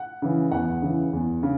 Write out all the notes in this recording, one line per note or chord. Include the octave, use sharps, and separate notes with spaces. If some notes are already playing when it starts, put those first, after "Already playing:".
Already playing: F#5
C#3 E3
E2 F#5
C#3 E3
E2
C#3